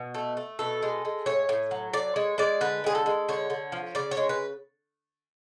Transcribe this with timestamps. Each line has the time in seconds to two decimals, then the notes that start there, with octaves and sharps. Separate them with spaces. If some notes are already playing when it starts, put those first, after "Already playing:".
Already playing: B2
0.15 A3
0.37 A3
0.59 B2 A4
0.82 G#3
1.05 G#3
1.26 A2 C#5
1.49 A2
1.71 F#3
1.93 A2 D5
2.16 G#3 C#5
2.38 G#3 D5
2.61 D3 B4
2.84 G#3 G#4
2.95 A4
3.06 G#3
3.28 D3 C#5
3.50 D3
3.72 F3
3.95 C#3 D5
4.11 C#5
4.17 G#3
4.29 B4